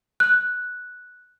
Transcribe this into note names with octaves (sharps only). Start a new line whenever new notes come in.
F#6